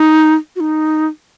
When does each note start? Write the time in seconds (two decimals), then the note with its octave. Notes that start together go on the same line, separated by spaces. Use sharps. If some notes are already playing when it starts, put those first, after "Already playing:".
Already playing: D#4
0.56 F#4
0.60 D#4